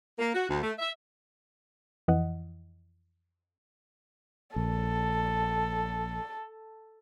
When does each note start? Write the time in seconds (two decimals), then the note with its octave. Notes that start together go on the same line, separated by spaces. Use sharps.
0.19 A#3
0.35 F#4
0.49 D2
0.63 A3
0.79 E5
2.08 F2 E3 D#5 F#5
4.56 A#1 A4